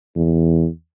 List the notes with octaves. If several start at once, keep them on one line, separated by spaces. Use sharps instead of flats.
E2